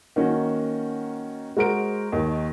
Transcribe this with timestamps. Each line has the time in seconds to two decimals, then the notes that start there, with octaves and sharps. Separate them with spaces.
0.16 D#3 A#3 C#4 F#4
1.57 G#3 F#4 A#4 C5 D7
2.12 D#2 D#3